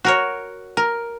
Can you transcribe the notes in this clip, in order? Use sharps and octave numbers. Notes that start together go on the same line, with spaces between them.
F#4 A#4 C#5
A#4